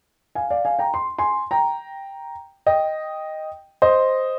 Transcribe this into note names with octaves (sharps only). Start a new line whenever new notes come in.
F5 G#5
D5 F5
F5 G#5
G5 A#5
C6
G#5 C6
G5 A#5
D#5 G5
C5 D#5